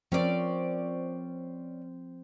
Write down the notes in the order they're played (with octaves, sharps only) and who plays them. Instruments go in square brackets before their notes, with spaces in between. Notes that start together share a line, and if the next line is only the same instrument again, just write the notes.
[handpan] F3 [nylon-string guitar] C4 A#4 C5 [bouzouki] C#4 D5